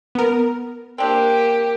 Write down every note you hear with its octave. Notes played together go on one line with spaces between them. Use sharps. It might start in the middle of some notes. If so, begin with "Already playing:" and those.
B3 A#4
A#3 C4 D4 G4